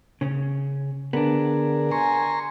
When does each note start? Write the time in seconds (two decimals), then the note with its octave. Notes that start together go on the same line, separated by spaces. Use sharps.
0.21 C#3 C#4
1.13 D3 B3 D4 G#4 A#4
1.91 G#5 A#5 C6 C#6